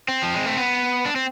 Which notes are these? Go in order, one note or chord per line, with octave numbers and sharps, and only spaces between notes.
C4
F3
G#3
A3
B3
D4
C4